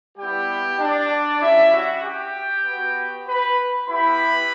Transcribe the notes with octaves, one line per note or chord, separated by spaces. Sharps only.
G3 B3 E4 G4 G5
D4 D5
G3 C#4 E4 G4 E5
F#4 F#5
G4 G5
B3 F#4
B4 B5
B3 E4 G4 B4 B5